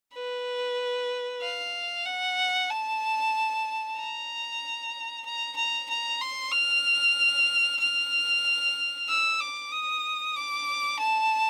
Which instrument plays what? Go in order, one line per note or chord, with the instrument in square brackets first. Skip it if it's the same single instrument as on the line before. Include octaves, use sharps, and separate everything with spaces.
[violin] B4
F5
F#5
A5
A#5
A#5
A#5
A#5
C6
F6
F6
E6
D6
D#6
D6
A5